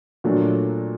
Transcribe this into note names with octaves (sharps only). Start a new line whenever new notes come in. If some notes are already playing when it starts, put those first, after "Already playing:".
A#2 F#3 A3 D4